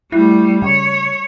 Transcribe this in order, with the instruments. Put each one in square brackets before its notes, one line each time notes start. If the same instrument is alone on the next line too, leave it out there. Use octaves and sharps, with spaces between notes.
[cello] G3 A3 [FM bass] E4
[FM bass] C#3 [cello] C#5